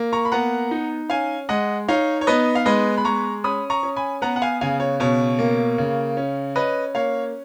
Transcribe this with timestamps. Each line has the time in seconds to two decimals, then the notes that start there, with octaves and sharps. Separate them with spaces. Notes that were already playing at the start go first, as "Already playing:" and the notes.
Already playing: A#3
0.13 A#5 C#6
0.25 B5
0.32 B3 F#5 A#5
0.71 D#4
1.10 C#4 F5 G#5
1.49 G#3 D#5 F#5
1.88 D#4 C#5 F5
2.21 C#5
2.27 B3 B4 D#5
2.55 F5
2.66 G#3 B4 D#5
2.97 B5
3.05 G#3 A#5 C#6
3.44 C#4 B5 D#6
3.70 A#5 C#6
3.83 C#4
3.96 G#5 B5
4.22 B3 F#5 A#5
4.36 F#5
4.42 F5 G#5
4.61 C#3 F5 G#5
4.80 C#5
5.00 B2 C#5
5.39 A#3
5.78 C#3
6.17 C#4
6.56 C#4 B4 D#5
6.95 A#3 C#5 F5